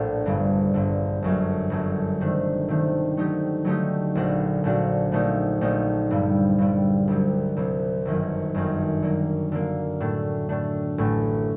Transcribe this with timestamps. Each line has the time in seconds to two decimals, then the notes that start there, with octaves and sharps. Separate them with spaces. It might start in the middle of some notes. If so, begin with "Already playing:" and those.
Already playing: A#1 A2 A3 D4
0.26 G1 G2 D3
0.74 G1 G2 D3
1.22 G1 F#2 F#3 A3
1.70 G1 F#2 F#3 A3
2.20 C3 D#3 A3 D4
2.68 C3 D#3 A3 D4
3.17 D3 F#3 A3 D#4 G4
3.65 D3 F#3 A3 D#4 G4
4.15 A#1 A#2 A3 D4 F#4
4.64 A#1 A#2 A3 D4 F#4
5.12 A#1 A#2 A3 D#4
5.61 A#1 A#2 A3 D#4
6.11 G2 D3 G3
6.58 G2 D3 G3
7.08 C2 C3 F#3
7.56 C2 C3 F#3
8.05 G1 F#2 D#3 F#3
8.54 G1 F#2 D#3 F#3
9.02 D3 F#3 A#3
9.52 D3 F#3 A#3
10.00 A2 A3 D4
10.49 A2 A3 D4
10.98 A1 A2 A3